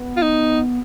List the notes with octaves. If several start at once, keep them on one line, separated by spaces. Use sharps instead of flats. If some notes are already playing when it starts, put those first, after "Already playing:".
Already playing: B3
F4
D#4